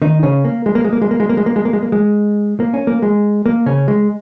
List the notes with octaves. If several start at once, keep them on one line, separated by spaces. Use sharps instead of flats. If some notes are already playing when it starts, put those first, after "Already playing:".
D#3 D#4
C#3 C#4
A#3
G#3
A#3
G#3
A#3
G#3
A#3
G#3
A#3
G#3
A#3
G#3
A#3
G#3
A#3
G#3
A#3
C#4
A#3
G#3
A#3
C#3 C#4
G#3